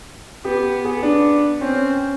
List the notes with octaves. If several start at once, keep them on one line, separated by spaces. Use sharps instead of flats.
B3 G4
B3 G#4
D4
C4 C#4